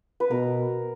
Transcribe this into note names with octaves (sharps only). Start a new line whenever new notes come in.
B4
B2 A#4